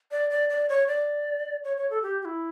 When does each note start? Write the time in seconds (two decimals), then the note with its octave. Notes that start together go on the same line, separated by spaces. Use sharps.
0.11 D5
0.30 D5
0.50 D5
0.69 C#5
0.88 D5
1.64 C#5
1.77 C#5
1.90 A4
2.03 G4
2.22 G4
2.25 E4